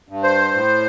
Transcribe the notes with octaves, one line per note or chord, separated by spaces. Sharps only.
G2
C5
A2